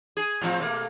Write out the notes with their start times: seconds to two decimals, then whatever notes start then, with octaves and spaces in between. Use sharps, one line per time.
0.17 G#4
0.41 A2 F3 C4
0.60 B2 A3 A#3